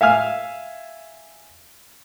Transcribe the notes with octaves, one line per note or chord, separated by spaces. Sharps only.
E5 F5 G#5 F6